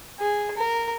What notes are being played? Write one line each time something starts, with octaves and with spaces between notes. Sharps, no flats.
G#4
A#4